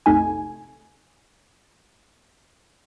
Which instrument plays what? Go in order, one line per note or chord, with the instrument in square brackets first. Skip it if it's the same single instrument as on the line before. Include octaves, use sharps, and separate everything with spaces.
[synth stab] A#1 F2 C3 A3 D#4 G#5